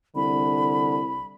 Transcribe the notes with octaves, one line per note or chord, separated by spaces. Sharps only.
C2 D3 B5